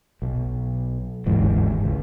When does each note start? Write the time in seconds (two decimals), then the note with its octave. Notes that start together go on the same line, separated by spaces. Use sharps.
0.22 B1
1.26 G1 D#2 G#2 E3
1.85 C#2